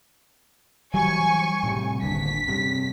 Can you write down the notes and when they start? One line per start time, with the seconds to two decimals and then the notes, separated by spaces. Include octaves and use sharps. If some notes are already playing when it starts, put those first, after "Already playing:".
0.94 E3 F#3 G3 G#5 C#6
1.63 A2 C3 G3
2.02 G1 D#2 D3 B6
2.48 G2 C3